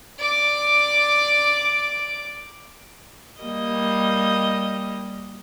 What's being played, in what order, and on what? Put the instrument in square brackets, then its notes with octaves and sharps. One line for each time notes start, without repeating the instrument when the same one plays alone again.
[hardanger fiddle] D5 D6
[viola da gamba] G3 A#3 D#5